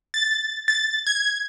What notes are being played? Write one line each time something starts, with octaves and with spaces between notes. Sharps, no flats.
A6
A6
G#6